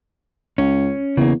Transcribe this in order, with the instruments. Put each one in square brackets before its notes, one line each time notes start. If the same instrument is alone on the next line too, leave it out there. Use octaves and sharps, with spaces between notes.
[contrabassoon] C#2 [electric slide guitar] C#4
[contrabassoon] E2 [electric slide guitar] C#3 A#3